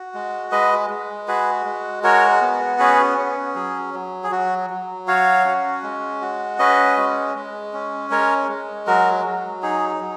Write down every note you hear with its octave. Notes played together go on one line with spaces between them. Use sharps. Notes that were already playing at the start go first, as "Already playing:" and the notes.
Already playing: F#4
G#3
G#3 B4 D#5
G#3
F#4 G#4 B4
G#3
F#4 A#4 C#5
B3
C#4 G#4 B4
C#4
F#3 G#4
F#3
G#4
F#3 F#4
F#3
F#4 C#5 F5
C#4
G#3
F#4
C#4 B4 D#5
G#3
G#3
C#4
G#3 A#4 C#5
G#3
F#3 F#4 A#4
F#3
D#4 G#4
F#3